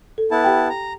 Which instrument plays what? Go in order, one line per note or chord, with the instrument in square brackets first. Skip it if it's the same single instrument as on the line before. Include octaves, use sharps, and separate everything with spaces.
[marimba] A4
[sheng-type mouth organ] B3 E4 A5
[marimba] G4 G5
[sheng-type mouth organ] A#5